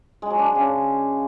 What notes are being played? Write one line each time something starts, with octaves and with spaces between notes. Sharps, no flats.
G#3
F#3
D4
G#3
C#3